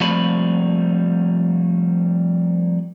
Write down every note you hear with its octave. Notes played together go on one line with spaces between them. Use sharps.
F3 G3 A3 A#3 C4 B5